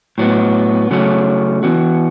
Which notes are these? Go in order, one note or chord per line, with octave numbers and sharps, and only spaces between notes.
A2 F#3 B3
C#3 F#3 A3 C#4
E3 B3 F#4